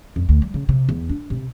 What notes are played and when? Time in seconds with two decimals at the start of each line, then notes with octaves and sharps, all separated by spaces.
0.16 F2
0.29 D2
0.42 G3
0.54 C#3
0.69 C3
0.89 E2
1.09 D4
1.30 C3